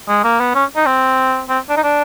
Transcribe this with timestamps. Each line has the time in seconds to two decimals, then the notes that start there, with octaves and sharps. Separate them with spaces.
0.09 G#3
0.24 A#3
0.40 B3
0.55 C#4
0.76 D#4
0.86 C4
1.49 C4
1.70 D4
1.77 D#4
1.83 D4